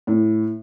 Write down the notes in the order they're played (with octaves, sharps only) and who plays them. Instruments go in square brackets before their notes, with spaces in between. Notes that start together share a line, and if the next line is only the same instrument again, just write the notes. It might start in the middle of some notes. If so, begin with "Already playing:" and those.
[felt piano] A2